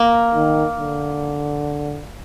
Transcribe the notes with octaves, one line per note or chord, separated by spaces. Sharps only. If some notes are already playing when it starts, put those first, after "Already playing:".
Already playing: A#3
D#3
D3